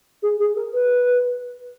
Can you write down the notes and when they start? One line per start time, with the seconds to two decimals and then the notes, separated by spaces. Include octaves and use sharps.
0.22 G#4
0.40 G#4
0.56 A#4
0.73 B4